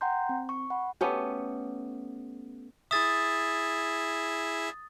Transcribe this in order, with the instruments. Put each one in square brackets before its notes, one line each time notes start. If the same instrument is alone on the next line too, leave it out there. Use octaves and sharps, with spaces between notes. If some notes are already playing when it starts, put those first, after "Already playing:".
[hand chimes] F#5 G5 A#5 C6 G6
C4
C#6
F#5 B5
[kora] A3 B3 C#4 G4
[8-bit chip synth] E4 G#4 E5 [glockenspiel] D#6 A6